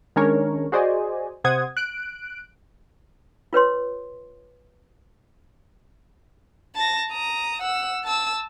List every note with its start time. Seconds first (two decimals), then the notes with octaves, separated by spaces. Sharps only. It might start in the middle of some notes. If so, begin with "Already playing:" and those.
0.16 D#3 G#3 C#4 D4 A#4 C#5
0.72 F#4 G#4 C5 D5 D#5 G#5
1.44 C3 C5 F#5 D#6 G#6
1.77 F#6 D7
3.53 F4 B4 C#5 C6
6.76 A5 A#6
7.10 A#5 D#6
7.62 F#5 E6
8.04 A5 E6